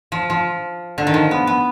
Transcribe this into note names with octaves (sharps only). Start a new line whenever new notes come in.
F3
F3
D3
D#3
F3
B3
B3